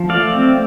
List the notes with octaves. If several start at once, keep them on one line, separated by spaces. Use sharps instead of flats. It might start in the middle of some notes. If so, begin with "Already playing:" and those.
Already playing: F3
A3 D5 F5
C4